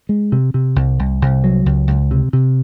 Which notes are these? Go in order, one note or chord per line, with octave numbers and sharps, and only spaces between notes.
G#3
C3
C3
C2
C2
C2
F#3
C#2
C#2
C3
C3